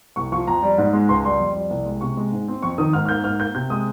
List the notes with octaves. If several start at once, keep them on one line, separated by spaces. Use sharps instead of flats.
C2 C#6
F3 C#6
F2 A#5
G3
G#2
G#3
C#2 C6
G3 C6
F2
G3
C2
G#3
C3 C#6
G#3
G#2
C4
F2 C#6
D#3 D#6
G#2 F6
F6
A#3 G6
G#2 F6
A#3 G6
C3 G6
G#3 D#6